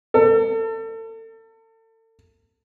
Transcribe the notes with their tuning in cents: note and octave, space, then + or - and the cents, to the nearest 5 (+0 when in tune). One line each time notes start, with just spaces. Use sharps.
A4 +35